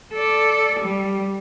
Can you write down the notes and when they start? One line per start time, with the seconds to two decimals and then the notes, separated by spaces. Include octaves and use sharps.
0.14 A4 D5
0.80 G3